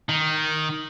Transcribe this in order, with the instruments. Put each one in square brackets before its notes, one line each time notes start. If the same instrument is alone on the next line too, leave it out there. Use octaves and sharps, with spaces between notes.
[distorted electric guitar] D#3